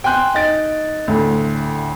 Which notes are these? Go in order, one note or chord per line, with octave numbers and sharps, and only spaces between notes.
G5 G#5 C6 F#6 G6
D#4 A6 D7
D2 A2